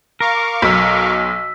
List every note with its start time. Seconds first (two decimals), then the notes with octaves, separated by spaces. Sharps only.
0.20 A#4 F5 C#6 D6
0.62 B1 E6 B6